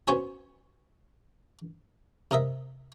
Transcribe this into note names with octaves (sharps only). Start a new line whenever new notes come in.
B3 C#4 F#4 C5 C#5 G#5
C3 A#4 D#5 E5